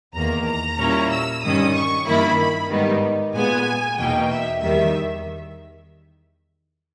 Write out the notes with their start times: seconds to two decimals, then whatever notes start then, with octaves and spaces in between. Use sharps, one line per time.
0.14 E2 D#3 A#3 A#5
0.46 A#5
0.79 A#2 G3 C#4 E4
1.11 E6
1.42 G2 D#3 G3 C#4 D#6
1.75 C#6
2.06 G2 D#3 A#3 E4 B5
2.38 B5
2.71 G#2 D#3 G3 B3 D#4
3.34 A#2 G#3 B3 G#5
3.98 E2 B2 A#3 D#4 G5
4.30 E5
4.61 E2 D#3 G3 E5